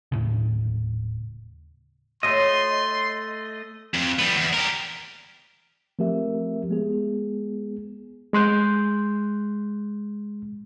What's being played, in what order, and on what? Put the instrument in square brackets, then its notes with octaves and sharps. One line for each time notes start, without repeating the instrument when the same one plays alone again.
[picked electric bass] D#1 A2 C#3
[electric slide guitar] A3 D#5 [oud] F#4 C#5 [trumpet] C6
[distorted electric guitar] F2
G3 B3
E2
G4 A#4
[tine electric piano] F3 A3 C4 G4 A#4 E5
G#3 B3 G#4
[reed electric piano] G#3 C6 F#6 G6